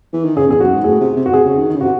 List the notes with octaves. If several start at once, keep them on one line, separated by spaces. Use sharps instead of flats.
E3
D#3
C#3 G#4
E2 G#4
F#2 F#4
G#2
A2 G#4
C3
C3
F#4
C3 G#4
C#3
D#3
D#3
C#3
C3 F#4